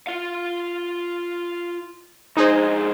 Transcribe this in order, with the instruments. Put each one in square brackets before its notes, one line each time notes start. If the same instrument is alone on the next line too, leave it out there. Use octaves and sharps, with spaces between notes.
[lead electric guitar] F4 F5
[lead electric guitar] F2 G#3 [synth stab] D#4 G#4 C5